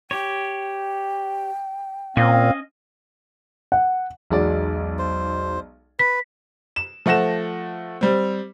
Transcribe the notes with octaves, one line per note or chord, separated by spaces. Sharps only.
G4 C#5 G5
A#2 C4 C#4 D#5 F5
F#5
B1 E2 G#3 D#4 F#4 D5
C5
B4 B6
E7
F3 A3 F#5 A#6 E7
G3 C4